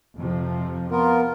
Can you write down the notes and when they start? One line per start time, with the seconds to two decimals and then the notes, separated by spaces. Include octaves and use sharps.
0.16 F2 C3 F3
0.91 B3 F4 A#4